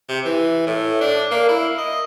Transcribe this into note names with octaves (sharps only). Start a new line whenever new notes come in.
C3
E3
A2
D4
A#3
E4
D#5